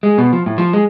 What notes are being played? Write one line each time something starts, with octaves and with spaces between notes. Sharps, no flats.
G#3
B2
F3
A2
F3
G#3